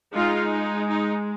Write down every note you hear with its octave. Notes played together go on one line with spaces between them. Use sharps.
G#3 D#4 F4
D#4